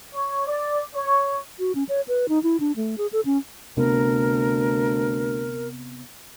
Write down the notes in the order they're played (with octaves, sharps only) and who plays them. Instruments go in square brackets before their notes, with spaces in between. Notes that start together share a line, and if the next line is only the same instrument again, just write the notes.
[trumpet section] C#5
D5
C#5
[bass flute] F#4
C#4
C#5
B4
D#4
E4
D4
A3
G#4
A4
C#4
[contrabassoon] D2 [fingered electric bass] C3 B3 [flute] A#4